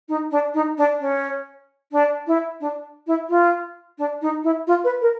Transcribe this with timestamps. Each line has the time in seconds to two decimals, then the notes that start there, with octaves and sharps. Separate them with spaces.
0.08 D#4
0.31 D4
0.54 D#4
0.77 D4
1.00 C#4
1.91 D4
2.27 E4
2.60 D4
3.07 E4
3.29 F4
3.98 D4
4.21 D#4
4.43 E4
4.67 F4
4.84 B4
5.01 A#4